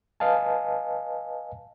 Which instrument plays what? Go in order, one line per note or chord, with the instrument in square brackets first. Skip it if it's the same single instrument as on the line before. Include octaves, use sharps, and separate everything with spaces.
[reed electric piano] B4 D#5 F5 G#5 A5